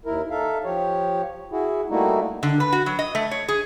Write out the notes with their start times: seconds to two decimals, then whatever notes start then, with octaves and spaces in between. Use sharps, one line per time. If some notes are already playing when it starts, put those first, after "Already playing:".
0.05 D#2 E4 A#4
0.30 D#4 A4 E5 F5
0.64 F3 G4 C#5
1.51 E4 F#4 G#4
1.90 G3 A3 A#3 D#4 E4 F#4
2.43 D3
2.60 B4
2.72 F#4
2.86 F#3
2.99 D#5
3.15 A3
3.31 C#5
3.48 G#4